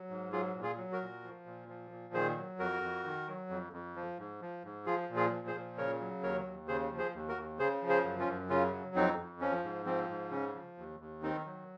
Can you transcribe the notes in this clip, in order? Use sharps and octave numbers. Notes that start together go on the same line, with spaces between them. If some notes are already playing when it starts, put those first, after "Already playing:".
Already playing: F#3
G#2
F#3 F4 G#4
A#2
F4 G#4
F#3
F#4 A#4
A#2
F3
A#2
F3
A#2
D#3 G#4 C5
F#3
F2 F#4 A#4
F2
D#3
F#3
F2
F2
F3
G#2
F3
G#2
F3 F4 G#4
A#2
F4 G#4
F3
G#4 C5
A#2
C#3 A#4 C#5
F#3
D#2 A#4 C#5
D#2
C#3 G#4 C5
F3
G#4 C5
D#2
F#4 A#4
D#2
C#3 G#4 C5
F3
G#4 C5
F#2
C#4 F4
F#2
C#3 C#4 F4
F#3
F2 C4 D#4
F2
F3 C#4
G#2
F3 C4
G#2
C#3 C#4
F3
D#2
D#2
D#3 C4 D#4
F#3